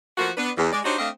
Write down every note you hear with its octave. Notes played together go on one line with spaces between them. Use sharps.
F3 A3 A#3 F4 F#4
B3 D4 B4
E2
G#3 D5
D4 D#4 F#4 G4 C5 C#5
A3 C4 D4 D#5 F5